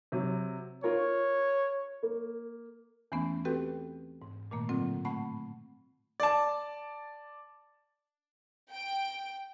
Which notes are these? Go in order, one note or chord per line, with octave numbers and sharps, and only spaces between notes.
C3 F#3
F4 A#4 C#5
A#3
E2 E3 A3 B3 C#4
C4 F#4 G4 A4 B4 G5
G#2
A#2 D#3 A3 A#3
A2 D3 F#3 C4 F4
A3 F#5 A5 B5 C#6
D5 A5
G5